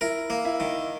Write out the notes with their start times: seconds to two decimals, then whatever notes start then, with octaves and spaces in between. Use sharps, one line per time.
0.01 E4 A#4
0.30 A#3
0.45 E4
0.60 D#3